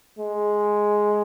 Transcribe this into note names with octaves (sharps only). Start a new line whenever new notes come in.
G#3